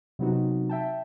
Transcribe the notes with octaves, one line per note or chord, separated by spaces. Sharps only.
C3 F#3 B3 C4 D#4 F#4
E5 G5 A5